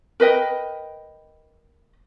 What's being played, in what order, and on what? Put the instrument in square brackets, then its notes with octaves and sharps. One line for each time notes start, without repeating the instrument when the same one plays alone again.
[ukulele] A#4 B4 D#5 G5